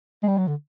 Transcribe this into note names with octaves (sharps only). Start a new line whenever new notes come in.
G#3
G3
F#3
D3